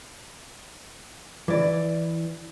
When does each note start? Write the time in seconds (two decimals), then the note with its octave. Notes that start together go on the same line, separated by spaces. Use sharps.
1.48 E3 D5